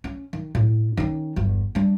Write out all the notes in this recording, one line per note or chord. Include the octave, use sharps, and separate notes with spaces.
C#4
D#3
A2
D#3 C#4
G1 E2
G3 D4